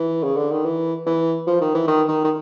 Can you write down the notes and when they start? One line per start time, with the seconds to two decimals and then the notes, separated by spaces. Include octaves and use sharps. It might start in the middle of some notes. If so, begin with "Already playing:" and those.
Already playing: E3
0.24 C#3
0.37 D3
0.51 D#3
0.65 E3
1.06 E3
1.47 F3
1.61 D#3
1.75 E3
1.88 D#3
2.08 D#3
2.24 D#3